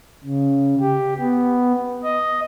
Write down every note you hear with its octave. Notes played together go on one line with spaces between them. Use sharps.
C#3
G4
B3
D#5